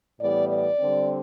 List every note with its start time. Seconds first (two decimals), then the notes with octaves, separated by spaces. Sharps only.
0.20 A2 E3 G3 B3 D5
0.49 D5
0.80 D3 G3 C4